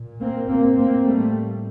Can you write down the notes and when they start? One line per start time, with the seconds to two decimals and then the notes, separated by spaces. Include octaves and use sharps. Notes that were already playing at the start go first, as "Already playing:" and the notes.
Already playing: A#2
0.20 A#3 C4
0.48 A#3 C4
0.77 A#3 C4
1.04 A2 G3 A3